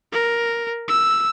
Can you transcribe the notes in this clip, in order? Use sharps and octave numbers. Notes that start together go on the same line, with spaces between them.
A#4
E6